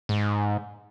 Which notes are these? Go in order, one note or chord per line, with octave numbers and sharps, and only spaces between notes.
G#2